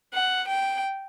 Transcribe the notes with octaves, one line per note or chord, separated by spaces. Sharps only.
F#5
G5